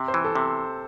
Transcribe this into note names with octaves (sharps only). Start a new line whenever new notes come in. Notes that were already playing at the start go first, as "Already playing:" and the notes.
Already playing: C3
C5
E3
A4
C3